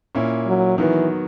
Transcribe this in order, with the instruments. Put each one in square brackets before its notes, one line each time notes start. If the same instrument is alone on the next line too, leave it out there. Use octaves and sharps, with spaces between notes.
[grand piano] A#2 A#3 C#4 E4
[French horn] F#3
[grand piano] D#3 F#3 B3 [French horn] E3